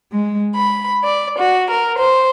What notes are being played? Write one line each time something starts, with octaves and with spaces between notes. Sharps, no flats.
G#3
B5
D5
F#4
A#4
C5